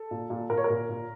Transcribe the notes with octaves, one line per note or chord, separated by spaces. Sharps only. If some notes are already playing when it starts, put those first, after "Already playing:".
Already playing: A4
A#2
A#2
A#2 A#4
C#5
A#4
A#2
A#2